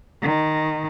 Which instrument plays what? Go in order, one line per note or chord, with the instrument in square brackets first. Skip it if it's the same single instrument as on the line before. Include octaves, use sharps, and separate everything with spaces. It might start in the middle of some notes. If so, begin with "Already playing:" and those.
[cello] D#3